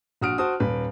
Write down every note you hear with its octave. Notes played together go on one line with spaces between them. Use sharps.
A#1 F#4 D#6 F6 D7
F#4 C5 A5 D#6
D#1 B4